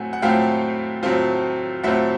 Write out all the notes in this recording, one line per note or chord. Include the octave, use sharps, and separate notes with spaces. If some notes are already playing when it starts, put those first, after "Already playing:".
Already playing: A2 F#3 A3 C4 F#5 G#5
F#5
A2 F#3 A3 C4 F4 F5 G5
A2 F#3 A3 C4 F4
A2 F#3 A3 C4 F4 E5 F#5